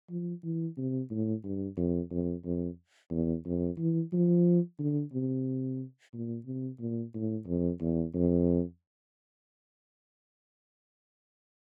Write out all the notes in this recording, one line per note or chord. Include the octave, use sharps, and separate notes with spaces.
F3
E3
C3
A2
G2
F2
F2
F2
E2
F2
E3
F3
D3
C3
A#2
C3
A#2
A2
F2
E2
F2